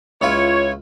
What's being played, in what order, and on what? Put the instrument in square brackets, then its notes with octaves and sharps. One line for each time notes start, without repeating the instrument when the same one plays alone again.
[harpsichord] C#2 E4 F4 [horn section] C#5